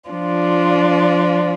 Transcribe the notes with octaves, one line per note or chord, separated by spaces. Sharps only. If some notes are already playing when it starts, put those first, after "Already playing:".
F3 D4 F4 D5